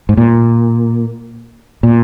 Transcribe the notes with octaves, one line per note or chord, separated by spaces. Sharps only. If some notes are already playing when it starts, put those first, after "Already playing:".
G#2
A#2
A#2